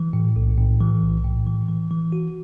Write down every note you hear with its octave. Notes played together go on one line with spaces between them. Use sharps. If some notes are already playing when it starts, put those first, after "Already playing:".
Already playing: E3
A2
B1
A2
E3
B1
A2
E3
E3
E3
F#4